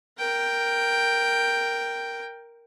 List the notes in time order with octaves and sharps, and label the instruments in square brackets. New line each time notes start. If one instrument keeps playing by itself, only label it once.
[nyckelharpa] A#4 G5